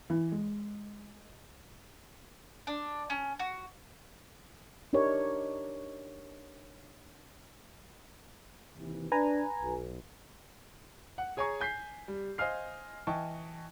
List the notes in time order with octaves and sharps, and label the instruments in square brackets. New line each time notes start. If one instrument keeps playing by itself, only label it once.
[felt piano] E3
G#3
[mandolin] D4
C#4
F#4
[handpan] D4 D#4 G4 A#4 C#5 D5
[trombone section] D#2 C3 E3
[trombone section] D4 [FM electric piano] B4 G#5 A#5
[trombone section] B1
[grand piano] F#5
G#4 C#5 G#5 A#5 C#6
G#5 G6 B6 C7
G3
C5 D#5 F5 G#5 F6 C7
E3 D#5 G5 A5 C#6